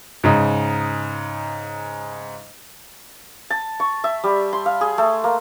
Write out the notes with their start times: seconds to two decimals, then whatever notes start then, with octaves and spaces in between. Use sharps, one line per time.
0.24 G#2 C#3 D#4
3.50 A5
3.80 C#6
4.04 E5
4.24 G3
4.53 C6
4.66 F5
4.81 G#4
4.98 A3
5.24 A#3